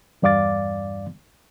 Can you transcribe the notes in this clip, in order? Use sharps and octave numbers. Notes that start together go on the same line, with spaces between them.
E2 G2 D5 F5 D6 A6